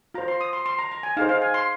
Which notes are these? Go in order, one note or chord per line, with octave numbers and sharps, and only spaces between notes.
F4 C5 A#5
C6
D#6
C6
C6
A#5
A#5
G#5
D#4 G#4 C5 F5
F5
G#5
C6